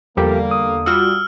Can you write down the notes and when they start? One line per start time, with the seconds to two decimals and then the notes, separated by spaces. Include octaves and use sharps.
0.17 E2 D3 F3 G3 A#3 G4 A4 A#4
0.51 D#6
0.86 G3 F4 F#4 E6 F6